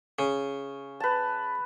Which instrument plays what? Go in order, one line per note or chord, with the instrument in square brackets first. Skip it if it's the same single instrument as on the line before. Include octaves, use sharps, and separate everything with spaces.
[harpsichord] C#3
[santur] B4 A5